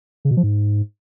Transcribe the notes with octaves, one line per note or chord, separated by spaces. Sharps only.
C#3
B2
F3
G#2